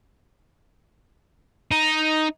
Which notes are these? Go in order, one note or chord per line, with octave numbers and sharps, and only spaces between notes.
D#4